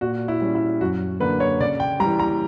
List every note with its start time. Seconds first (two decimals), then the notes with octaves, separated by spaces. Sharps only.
0.01 A#2 F#4
0.28 E4
0.41 G3 C#4
0.55 E4
0.81 F#2 F#4
1.20 D3 A#3 B4
1.40 C#5
1.60 C#3 D5
1.80 G5
2.00 G3 A#5
2.04 E3
2.20 A#5